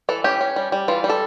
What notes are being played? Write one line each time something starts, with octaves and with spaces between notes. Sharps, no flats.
E3 A4
C#4 G4
C#4
G3
G3
E3 F4
G3
A4